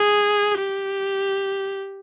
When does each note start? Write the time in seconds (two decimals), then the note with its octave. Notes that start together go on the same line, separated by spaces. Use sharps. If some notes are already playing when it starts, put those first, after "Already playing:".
Already playing: G#4
0.58 G4